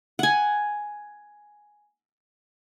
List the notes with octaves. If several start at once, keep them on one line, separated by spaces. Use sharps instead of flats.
F#5 G#5